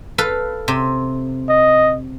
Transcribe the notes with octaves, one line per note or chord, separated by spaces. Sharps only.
A4 B4 F5
C3
D#5